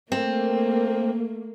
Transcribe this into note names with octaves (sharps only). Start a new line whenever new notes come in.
A3 A#3 C4